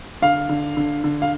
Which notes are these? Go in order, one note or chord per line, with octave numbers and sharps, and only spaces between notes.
D3 F5
D3
D3
D3
F5